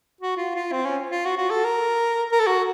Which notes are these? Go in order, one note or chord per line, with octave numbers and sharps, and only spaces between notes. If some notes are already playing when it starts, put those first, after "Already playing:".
F#4
F4
F4
C4
C#4
F4
F#4
F#4
A4
A#4
A#4
A4
F#4